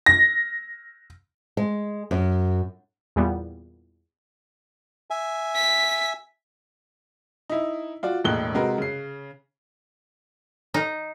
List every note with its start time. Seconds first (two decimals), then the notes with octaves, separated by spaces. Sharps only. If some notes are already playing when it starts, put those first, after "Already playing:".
0.06 A#6
1.57 G#3
2.11 F#2
3.16 E2 A#2 G3 B3
5.10 E5 G#5
5.56 B6
7.50 D#4 E4
8.03 F4 F#4 D5
8.24 E1 A2 G#3 A#3 F#6 G7
8.54 C3 G#3 F#4 A#4 B4
8.78 C#3 C7
10.74 D#4